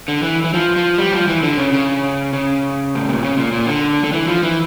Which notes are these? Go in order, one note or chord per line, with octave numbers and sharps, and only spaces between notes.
D3
E3
E3
F3
F3
G3
F3
E3
D3
C#3
C#3
C#3
A2
A#2
C#3
A#2
A#2
D3
D3
E3
F3
E3